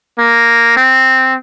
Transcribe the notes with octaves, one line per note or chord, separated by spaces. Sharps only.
A#3
C4